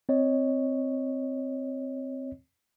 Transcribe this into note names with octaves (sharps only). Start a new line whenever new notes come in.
C4 C#5 D#5